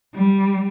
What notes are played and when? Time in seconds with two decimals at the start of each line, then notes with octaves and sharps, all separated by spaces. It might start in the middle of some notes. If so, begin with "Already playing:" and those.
0.14 G3